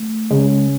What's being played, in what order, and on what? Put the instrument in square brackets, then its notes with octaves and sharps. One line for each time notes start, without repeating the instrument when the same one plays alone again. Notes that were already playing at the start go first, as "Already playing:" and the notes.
Already playing: [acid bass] A3
[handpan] C#3 C#4 [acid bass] G#3